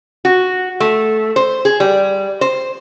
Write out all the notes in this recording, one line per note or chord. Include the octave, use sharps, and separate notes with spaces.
F#4
A3
C5
G#4
G3
C5